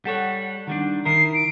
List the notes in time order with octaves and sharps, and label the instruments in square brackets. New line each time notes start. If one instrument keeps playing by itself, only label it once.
[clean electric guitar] G3 A4 C#5 [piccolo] F#5
[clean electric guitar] D#3 G3 D4
[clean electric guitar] D#3 E4 A#4 [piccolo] C7
[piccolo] D7